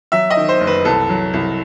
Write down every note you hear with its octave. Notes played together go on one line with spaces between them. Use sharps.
F#3 E5
D#5
D#3
C5
F#1
B4
C2 A4
F#3
C2